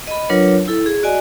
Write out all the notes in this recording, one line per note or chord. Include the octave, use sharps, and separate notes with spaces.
D#5 B5
F#3 D4 F4 A#4 B4 C#5
E4 A4
G#4
F#4 D5 D#5 G#5